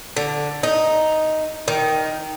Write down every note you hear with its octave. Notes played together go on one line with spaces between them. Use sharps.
D3
D#4
D#3